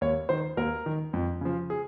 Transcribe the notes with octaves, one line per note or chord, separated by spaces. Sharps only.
D#2 C#5
D#3 C5
D#2 A#4
D#3
F2
C#3 F3
G#4